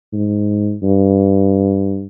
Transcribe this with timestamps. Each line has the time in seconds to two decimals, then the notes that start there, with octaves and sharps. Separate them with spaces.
0.13 G#2
0.83 G2